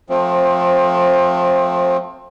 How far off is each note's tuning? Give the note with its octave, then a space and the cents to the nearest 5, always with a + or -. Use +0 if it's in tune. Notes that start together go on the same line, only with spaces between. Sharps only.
F3 +30 A3 +0 C4 +20